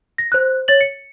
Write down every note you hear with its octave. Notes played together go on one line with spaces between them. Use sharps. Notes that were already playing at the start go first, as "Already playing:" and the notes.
A#6
C5 F#6
C#5 A6 F#7
C#7